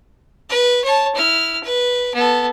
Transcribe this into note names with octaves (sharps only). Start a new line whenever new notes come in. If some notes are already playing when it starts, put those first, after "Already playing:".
B4
C#5 A5
E4 F6
B4
B3 A4